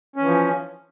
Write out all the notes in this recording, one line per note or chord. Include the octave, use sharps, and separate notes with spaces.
E3 F3 C#4